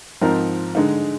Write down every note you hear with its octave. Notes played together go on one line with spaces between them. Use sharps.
G#2 F3 C4 D#4 A#4
D3 G#3 D#4